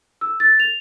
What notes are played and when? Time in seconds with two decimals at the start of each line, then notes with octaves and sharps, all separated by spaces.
0.21 E6
0.40 A6
0.60 F7